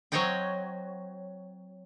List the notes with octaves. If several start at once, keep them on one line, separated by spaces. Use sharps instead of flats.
F#3 C4 C#5 D#5 F#5 G5